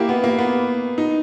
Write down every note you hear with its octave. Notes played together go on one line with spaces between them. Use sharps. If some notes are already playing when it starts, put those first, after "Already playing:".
Already playing: A#3 E4 G4
B3
A#3
B3
D#4